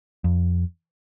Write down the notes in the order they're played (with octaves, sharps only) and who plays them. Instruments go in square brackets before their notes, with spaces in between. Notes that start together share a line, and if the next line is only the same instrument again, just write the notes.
[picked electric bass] F2